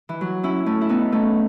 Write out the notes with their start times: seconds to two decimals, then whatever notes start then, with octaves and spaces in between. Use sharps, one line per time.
0.09 E3
0.21 F#3
0.43 C#4 E4
0.66 A3 C#4
0.81 E4
0.89 B3 D#4
1.12 A3 C#4